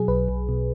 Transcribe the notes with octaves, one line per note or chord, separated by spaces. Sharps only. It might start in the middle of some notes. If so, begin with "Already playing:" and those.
Already playing: B2 F#3 G#4
B1 B4
B1
B2